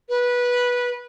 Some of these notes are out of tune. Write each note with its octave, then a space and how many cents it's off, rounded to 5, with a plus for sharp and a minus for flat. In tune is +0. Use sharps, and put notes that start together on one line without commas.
B4 -15